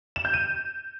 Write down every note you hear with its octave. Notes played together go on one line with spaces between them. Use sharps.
E7
G6
D#7